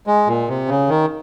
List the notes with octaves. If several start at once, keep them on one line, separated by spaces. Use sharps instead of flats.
G#3
A#2
C3
C#3
D#3